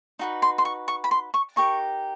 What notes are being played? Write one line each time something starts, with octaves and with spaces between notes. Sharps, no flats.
D#4 F#4 B4
C6
C6
C#6
C#6
B5
C6
C#6
D#4 G4 A#4 C#6